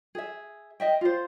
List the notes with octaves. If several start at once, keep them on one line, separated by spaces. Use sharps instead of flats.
G#4 E5
D#5 E5 G5
F4 C5